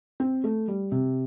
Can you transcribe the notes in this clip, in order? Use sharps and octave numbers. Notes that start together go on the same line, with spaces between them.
C4
A3
G3
C3